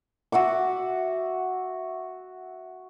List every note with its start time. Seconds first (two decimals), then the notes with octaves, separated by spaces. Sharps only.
0.32 F#4 E5 F#5 D6